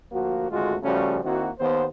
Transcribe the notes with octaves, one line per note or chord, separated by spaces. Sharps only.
D2 F3 A#3 F#4
G#1 D2 G#3 A3 F4 F#4
C#3 F3 G3 A3 C#4 F#4
D#3 A#3 C4 E4 F#4
D#2 B3 C5